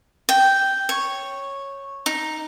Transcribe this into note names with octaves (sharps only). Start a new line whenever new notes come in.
G5
C#5
D#4